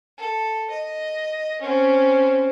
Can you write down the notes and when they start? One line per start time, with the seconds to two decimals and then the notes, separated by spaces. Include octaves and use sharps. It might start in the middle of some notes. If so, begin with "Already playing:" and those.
0.18 A4
0.70 D#5
1.61 C4 C#4